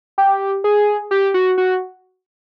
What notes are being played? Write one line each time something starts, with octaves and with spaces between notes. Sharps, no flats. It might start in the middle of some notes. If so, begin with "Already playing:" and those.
G4
G#4
G4
F#4
F#4